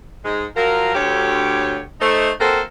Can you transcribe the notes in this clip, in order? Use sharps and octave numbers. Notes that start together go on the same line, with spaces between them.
G#2 G#3 D#4
F3 F#3 F4 A#4
D2 G4 C#5
A3 D#4 C5
A#3 C4 F#4 A4 A#4 C5